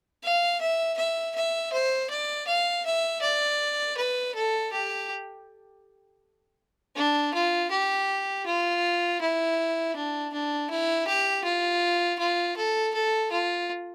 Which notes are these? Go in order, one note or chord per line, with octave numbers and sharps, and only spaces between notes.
F5
E5
E5
E5
C5
D5
F5
E5
D5
B4
A4
G4
D4
F4
G4
F4
E4
D4
D4
E4
G4
F4
F4
A4
A4
F4